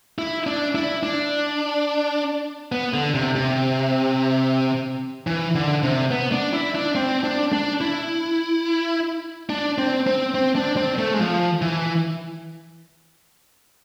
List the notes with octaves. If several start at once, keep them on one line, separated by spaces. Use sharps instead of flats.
E4
D4
E4
D4
B3
D3
C3
C3
E3
D3
C3
B3
D4
E4
D4
C4
D4
D4
E4
D4
C4
C4
C4
D4
C4
A3
G#3
F3
E3